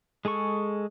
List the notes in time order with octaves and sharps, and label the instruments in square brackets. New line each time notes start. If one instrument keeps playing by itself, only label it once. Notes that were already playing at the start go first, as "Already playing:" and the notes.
[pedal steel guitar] G#3 G#4 A4 C#6